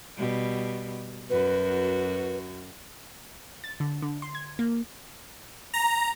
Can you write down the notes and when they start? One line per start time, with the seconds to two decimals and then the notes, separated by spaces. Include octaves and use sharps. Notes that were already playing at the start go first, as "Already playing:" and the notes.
0.17 B2 G3
1.30 F#2 F#4 B4
3.64 A6
3.80 D3
4.02 D3
4.22 C6
4.35 G#6
4.59 A#3
5.74 A#5